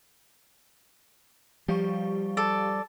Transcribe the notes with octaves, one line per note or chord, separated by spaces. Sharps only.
F3 G3 G4 F5 C#6
A4 D5